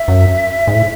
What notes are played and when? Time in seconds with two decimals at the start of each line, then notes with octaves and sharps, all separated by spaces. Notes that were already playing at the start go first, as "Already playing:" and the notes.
Already playing: E5
0.08 F#2
0.67 G#2
0.75 A2